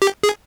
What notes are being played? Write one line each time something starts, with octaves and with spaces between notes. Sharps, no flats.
G4
G#4